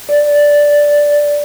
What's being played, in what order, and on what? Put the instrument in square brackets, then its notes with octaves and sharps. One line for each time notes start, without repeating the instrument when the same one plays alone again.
[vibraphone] D5